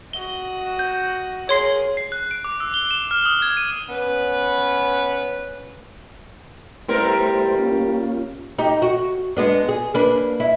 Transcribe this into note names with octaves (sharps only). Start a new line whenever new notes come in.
F#4 D#5 G7
G6
G#4 A#4 C#5 C6 C7
C7
F#6
D7
D6
E6
G7
E7
F6
D#6
G#6
D#7
B3 C#4 B4
G3 A3 B3 E4 A#4 C5
A#3 C#4 F4
D#4 G4
F#4
G#3 B3 D4
G#4
A#3 D4 B4
E4